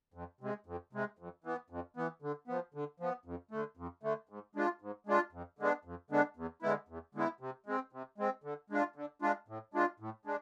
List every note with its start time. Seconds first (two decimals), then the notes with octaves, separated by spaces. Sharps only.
0.14 F2
0.41 C3 G#3
0.66 F2
0.93 C3 G#3
1.19 F2
1.44 E3 B3
1.70 F2
1.97 E3 B3
2.22 D3
2.48 F3 B3
2.74 D3
3.00 F3 B3
3.25 F2
3.51 D3 A3
3.77 F2
4.03 D3 A3
4.29 G#2
4.55 G#3 D4 F4
4.82 G#2
5.07 G#3 D4 F4
5.32 F2
5.59 D3 G#3 B3 D4
5.85 F2
6.10 D3 G#3 B3 D4
6.37 E2
6.62 D3 G#3 B3 E4
6.89 E2
7.15 D3 G#3 B3 E4
7.40 C3
7.66 G#3 C4
7.93 C3
8.18 G#3 C4
8.44 D3
8.70 G#3 D4 F4
8.96 D3
9.22 G#3 D4 F4
9.48 A2
9.74 G#3 D4 F4
10.00 A2
10.25 G#3 D4